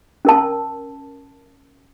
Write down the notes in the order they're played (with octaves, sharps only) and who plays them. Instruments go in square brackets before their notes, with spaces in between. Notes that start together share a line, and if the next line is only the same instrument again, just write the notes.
[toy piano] C#4 A#4 A5